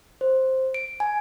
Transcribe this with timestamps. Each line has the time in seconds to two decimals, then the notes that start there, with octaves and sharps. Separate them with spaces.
0.21 C5
0.74 D7
1.00 G#5